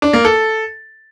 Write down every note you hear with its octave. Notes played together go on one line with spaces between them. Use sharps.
D4
A#3
A4